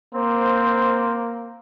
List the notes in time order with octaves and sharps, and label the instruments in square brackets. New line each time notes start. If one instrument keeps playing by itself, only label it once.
[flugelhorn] A#3 [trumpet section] C4 C5